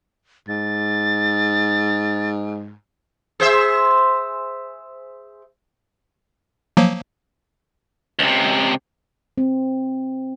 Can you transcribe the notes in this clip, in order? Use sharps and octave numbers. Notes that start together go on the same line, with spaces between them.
G#2 A6
G#4 C5 E5
F3 F#3 A#3
C#2 C3
C4